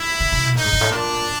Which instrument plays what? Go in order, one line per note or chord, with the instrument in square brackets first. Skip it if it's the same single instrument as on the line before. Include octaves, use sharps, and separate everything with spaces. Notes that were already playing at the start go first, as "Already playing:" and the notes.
Already playing: [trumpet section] E4
[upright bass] C#3
C3
B2
[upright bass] A#2 [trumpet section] D#4
[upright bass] G#2
G2
A2
[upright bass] A#2 [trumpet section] D4